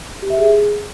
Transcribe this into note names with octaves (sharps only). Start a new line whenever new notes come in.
G4
E5
G#4